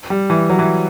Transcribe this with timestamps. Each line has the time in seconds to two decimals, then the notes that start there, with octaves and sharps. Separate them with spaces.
0.10 G3
0.30 E3
0.50 F#3
0.59 E3